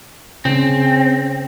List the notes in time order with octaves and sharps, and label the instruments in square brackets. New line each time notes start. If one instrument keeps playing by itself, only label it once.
[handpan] C#3 C#4 [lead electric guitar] C4